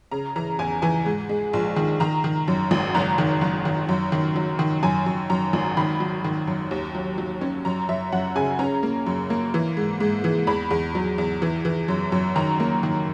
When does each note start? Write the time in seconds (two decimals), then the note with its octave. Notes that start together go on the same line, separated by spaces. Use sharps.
0.11 C#3 A#5
0.36 E3 A#5
0.59 E2 G#5
0.82 E3 G#5
1.06 G#2
1.29 G#3
1.53 A#1
1.76 D#3
2.00 D#3 A#5
2.24 D#3
2.48 F#2
2.71 G#1
2.95 F#1 A#5
3.18 D#3
3.41 F#1
3.65 D#3
3.89 F#2
4.12 D#3
4.36 F#3
4.59 D#3
4.83 F#2 G#5
5.06 F#2
5.30 F#2 A#5
5.53 G#1
5.77 D#3 B5
6.00 F#3
6.24 D#3
6.47 F#2
6.71 D#2
6.95 F#3
7.18 F#3
7.41 C#4
7.65 F#2 A#5
7.89 F#2 E5
8.12 F#2 F#5
8.36 C#3 G#5
8.59 C#4 A#5
8.83 A#3
9.06 F#2
9.30 A#3
9.54 E3
9.77 G#2
10.00 G#2
10.24 E3
10.47 E2 B5
10.71 E2
10.95 F#3
11.18 E2
11.42 E3
11.65 E3
11.88 F#2
12.12 F#2
12.36 D#3 A#5
12.60 A#3
12.83 D#3